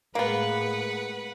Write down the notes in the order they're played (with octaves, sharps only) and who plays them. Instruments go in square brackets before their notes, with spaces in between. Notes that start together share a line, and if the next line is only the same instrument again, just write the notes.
[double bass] A2 G#3 [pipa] A#3 B3 [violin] B4 F#5 [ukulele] F5 B5